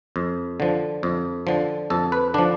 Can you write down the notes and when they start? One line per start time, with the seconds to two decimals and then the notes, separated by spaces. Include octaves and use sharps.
0.16 F2
0.60 D3 F3
1.03 F2
1.47 D3 F3
1.90 F2 A4
2.12 B4
2.34 D3 F3 D4